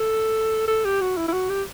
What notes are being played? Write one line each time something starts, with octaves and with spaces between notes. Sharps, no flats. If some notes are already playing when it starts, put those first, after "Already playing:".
Already playing: A4
A4
G4
F#4
E4
E4
F#4
G4